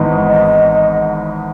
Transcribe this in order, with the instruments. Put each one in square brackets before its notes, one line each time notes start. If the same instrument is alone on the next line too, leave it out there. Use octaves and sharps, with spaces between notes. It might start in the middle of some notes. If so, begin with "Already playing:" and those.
Already playing: [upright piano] G#1 G#2 E3 B3 D#4
[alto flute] D#5